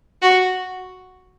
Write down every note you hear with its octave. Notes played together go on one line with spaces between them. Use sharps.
F#4